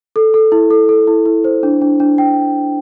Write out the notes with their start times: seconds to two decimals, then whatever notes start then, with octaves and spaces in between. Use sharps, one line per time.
0.16 A4
0.34 A4
0.52 E4
0.71 A4
0.89 A4
1.07 E4
1.26 E4
1.44 C5
1.63 D4
1.81 D4
2.00 D4
2.18 G5